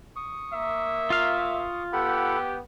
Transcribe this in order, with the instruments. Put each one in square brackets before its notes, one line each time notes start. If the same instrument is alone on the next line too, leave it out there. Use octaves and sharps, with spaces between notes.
[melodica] C#6 D#6
[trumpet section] A#3 E5
[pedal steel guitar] F4 F5
[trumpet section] B3 G4 [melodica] A4 F#5 B5